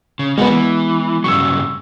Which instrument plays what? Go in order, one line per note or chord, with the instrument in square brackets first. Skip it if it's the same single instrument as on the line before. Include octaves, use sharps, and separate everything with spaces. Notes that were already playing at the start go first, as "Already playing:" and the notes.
[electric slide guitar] C#3
[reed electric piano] G#3 B3 [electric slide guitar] A#3 F#4
[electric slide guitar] E3
[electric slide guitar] G2 C#3 F#3 [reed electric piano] C#6 E6